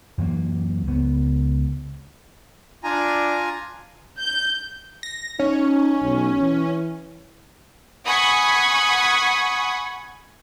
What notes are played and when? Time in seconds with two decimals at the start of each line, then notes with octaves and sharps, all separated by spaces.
0.18 F#2 E3 F#3 A#3
0.87 C#2 B3
2.84 D4 F4 G#5 A#5
4.18 G6
5.03 A#6
5.39 C#4 D#4
6.02 B1
6.40 E3
8.06 F#5 G#5 B5 C#6 D#6